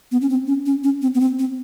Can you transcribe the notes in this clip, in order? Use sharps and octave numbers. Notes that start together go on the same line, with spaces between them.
B3
C#4
C4
C#4
C#4
C#4
C4
B3
C4
C4